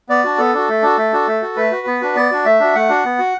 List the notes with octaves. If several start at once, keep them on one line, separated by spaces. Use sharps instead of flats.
B3 D5
D4 F#4
B3 A4
D4 F#4
A3
D4 F#4
A3
D4 F#4
A3
F#4
A3 B4
F#4
B3
D4 F#4
B3 D5
D4 F#4
A3 E5
D4 F#4
A3 F#5
D4 F#4
B3
F#4